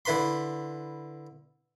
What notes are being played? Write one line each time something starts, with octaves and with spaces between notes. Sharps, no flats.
D3 E4 B4 B5 C6